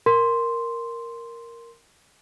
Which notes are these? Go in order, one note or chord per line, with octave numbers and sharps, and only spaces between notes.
A#4 C6